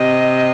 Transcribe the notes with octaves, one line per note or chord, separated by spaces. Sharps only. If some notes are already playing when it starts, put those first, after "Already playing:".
Already playing: C3 D#5